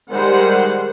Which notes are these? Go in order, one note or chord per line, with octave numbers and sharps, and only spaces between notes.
D#3 G3 G#3 C5 F#5